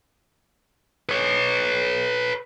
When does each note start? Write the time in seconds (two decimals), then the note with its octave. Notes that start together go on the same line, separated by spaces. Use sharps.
1.09 B4 C#5